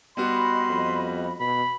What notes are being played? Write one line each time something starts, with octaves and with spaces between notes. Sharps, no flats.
G3 B3 F#4 D#5 B5 C6
F2
B2 B5